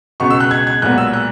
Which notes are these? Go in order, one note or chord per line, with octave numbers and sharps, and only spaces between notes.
C#2 B2 G#3 B3 C#6
E6
F#6
G#6
G#6
B1 A#2 G#3 B3 F#6
E6
F#6